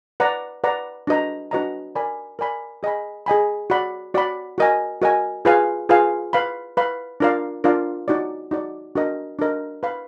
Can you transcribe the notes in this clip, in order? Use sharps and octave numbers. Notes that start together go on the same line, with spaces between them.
B4 D5 F#5 A#5
B4 D5 F#5 A#5
D4 F#4 B4 D#5 A#5
D4 F#4 B4 D#5 A#5
A#4 D5 G#5 B5
A#4 D5 G#5 B5
G#4 D#5 G#5 B5
G#4 D#5 G#5 B5
F#4 D5 F#5 B5
F#4 D5 F#5 B5
F#4 A#4 D#5 G#5
F#4 A#4 D#5 G#5
F4 G#4 B4 F5 G#5
F4 G#4 B4 F5 G#5
B4 F5 B5
B4 F5 B5
D4 F4 A#4 D5 F5
D4 F4 A#4 D5 F5
D#4 F#4 D5
D#4 F#4 D5
D4 F#4 A#4 D#5
D4 F#4 A#4 D#5
B4 F5 B5